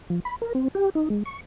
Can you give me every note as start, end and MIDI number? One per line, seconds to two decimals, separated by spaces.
0.10 0.20 53
0.25 0.36 83
0.42 0.53 70
0.55 0.68 60
0.75 0.90 67
0.95 1.09 63
1.10 1.23 56
1.25 1.40 85